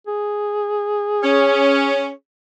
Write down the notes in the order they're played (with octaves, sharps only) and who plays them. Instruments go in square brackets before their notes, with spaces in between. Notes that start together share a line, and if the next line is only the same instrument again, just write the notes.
[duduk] G#4
[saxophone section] C#4